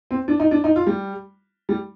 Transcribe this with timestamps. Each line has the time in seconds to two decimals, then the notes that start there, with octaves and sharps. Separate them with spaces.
0.11 C4
0.28 D4
0.40 D#4
0.51 D4
0.64 D#4
0.76 F4
0.87 G3
1.69 G3